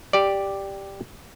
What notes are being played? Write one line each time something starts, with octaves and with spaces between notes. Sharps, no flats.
G4 D5